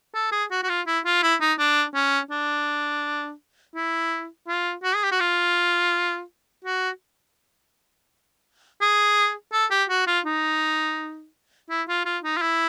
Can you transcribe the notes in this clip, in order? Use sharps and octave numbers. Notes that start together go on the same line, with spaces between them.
A4
G#4
F#4
F#4
F4
E4
F4
E4
D#4
D4
C#4
D4
E4
F4
F#4
G#4
G4
F#4
F4
F#4
G#4
A4
G4
F#4
F4
D#4
E4
F4
F4
D#4
F4
E4